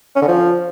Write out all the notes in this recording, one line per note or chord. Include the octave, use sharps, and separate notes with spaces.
C#4
D3
F3